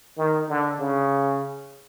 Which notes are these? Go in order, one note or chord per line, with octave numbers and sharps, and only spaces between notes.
D#3
D3
C#3